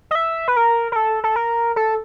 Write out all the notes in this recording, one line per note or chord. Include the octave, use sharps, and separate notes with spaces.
D#5
E5
B4
A#4
A#4
A4
A4
A#4
A4